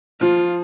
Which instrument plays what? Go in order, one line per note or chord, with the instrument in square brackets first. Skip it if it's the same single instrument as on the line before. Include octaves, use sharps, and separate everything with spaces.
[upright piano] F3 [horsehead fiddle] F4